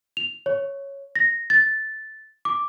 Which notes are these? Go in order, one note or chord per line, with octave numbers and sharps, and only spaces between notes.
F7
C#5
A#6
A6
D6